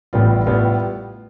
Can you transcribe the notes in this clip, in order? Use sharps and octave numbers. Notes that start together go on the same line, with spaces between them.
A1 A2 G3 B3 F4
A2 G3 B3 F4